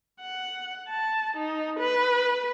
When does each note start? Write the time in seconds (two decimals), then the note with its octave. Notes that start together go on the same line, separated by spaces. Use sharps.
0.21 F#5
0.89 A5
1.36 D#4
1.79 B4